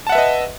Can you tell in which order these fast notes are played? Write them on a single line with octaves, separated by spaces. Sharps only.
A5 F#5 E5 B4 D#5